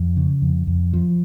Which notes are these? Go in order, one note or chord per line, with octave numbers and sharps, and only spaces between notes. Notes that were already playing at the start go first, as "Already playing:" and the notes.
Already playing: F2
C#3
F2
F2
F3